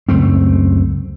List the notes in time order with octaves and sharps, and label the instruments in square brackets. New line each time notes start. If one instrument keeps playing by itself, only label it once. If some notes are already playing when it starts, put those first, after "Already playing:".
[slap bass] C#2 F#2 A3 C4